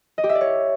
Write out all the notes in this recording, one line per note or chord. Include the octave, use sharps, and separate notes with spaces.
D#5
G4
E5
D5
C#5